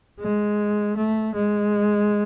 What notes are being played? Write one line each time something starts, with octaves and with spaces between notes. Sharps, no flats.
G#3
A3
G#3